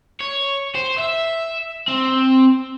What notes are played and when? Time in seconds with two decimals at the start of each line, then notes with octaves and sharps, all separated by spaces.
0.20 C#5
0.75 C5
0.98 E5
1.88 C4